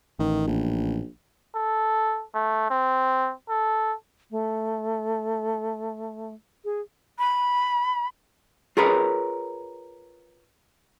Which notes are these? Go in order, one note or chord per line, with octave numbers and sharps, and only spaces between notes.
A1 D#3
A#1
A4
A3
C4
A4
A3
G#4
B5
F4 G#4 A#4 B4 C#5